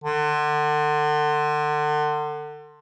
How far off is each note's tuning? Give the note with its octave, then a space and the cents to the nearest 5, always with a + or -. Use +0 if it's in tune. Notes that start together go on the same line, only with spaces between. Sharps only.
D3 +35